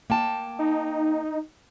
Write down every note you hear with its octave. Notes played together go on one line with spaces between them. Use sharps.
A#3 G5 A5
D#4